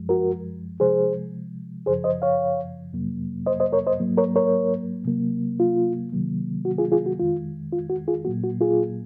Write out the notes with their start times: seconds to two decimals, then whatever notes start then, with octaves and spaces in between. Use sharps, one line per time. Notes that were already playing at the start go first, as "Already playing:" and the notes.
Already playing: F#2 F3 G#3
0.09 F#4 A#4
0.80 C3 F3 G#3 G#4 C5
1.86 F#2 C#3 F3 G#4 C5
2.04 C5 D#5
2.22 C#5 F5
2.93 F2 C3 F#3 A#3
3.46 C5 D#5
3.60 C5 D#5
3.73 A#4 C#5
3.87 C5 D#5
3.99 G#2 F#3 A#3
4.18 A#4 C#5
4.36 A#4 C#5
5.05 C3 F#3 A#3
5.60 F4
6.12 C3 D#3 F#3 A#3
6.65 F#4
6.78 F4 G#4
6.92 F4 G#4
7.06 F#4
7.19 F2 D#3 G#3 F4
7.72 F4
7.90 F#4
8.08 F4 G#4
8.25 A#2 F#3 A#3 F#4
8.44 F#4
8.61 F4 G#4